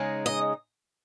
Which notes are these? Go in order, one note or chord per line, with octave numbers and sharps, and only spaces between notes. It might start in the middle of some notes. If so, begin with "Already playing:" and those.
Already playing: C#3 G#3 D#4
D#5